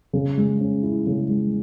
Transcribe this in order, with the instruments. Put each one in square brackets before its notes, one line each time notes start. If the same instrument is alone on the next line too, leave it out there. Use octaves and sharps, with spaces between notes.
[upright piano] C#3
G#3
C#4
E4
C#3
G#3